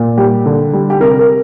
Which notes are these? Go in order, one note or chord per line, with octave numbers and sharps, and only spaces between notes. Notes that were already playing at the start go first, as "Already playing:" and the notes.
Already playing: A#2
G3 G4
D3
G3
G4
C3 A#4
A#4